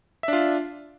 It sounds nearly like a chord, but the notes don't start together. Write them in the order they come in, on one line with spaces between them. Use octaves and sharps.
E5 D4 F4